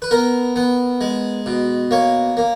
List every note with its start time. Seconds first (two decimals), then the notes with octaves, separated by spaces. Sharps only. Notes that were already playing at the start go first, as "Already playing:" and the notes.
0.02 B4
0.11 B3 A#4
0.56 B3
1.01 G#3
1.46 B2
1.91 A#3 C#5
2.37 A#3